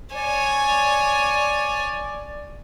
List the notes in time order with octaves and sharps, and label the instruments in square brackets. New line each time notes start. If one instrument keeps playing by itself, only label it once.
[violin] C#5 G#5 [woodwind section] D5